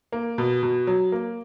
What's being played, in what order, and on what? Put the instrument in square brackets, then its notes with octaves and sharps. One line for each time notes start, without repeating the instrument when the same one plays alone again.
[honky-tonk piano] A#3
B2
B2
F#3
A#3